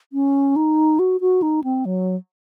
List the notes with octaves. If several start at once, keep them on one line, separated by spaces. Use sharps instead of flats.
C#4
D#4
F#4
F#4
D#4
C4
F#3